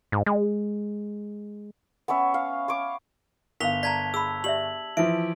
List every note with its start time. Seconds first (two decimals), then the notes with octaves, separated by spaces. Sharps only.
0.12 G#2
0.26 G#3
2.08 B3 C#4 C#5 E5
2.34 F5
2.68 C#5 C#6 D6
3.60 G1 A#4 F5 B6 F7 G7
3.83 D5 A5 A#5 G#6 B6
4.14 G#4 B5 E6
4.44 G4 D5 E5 F#7
4.97 E3 F3 E5 D7